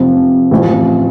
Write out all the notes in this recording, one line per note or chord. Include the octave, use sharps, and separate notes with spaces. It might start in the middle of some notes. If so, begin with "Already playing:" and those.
Already playing: F1 F2 C3 F3
A1 A2 F3 C4